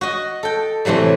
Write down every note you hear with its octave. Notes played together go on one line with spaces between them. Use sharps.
F#4 D#5
A4 G5
A2 C3 E3 F#3 G3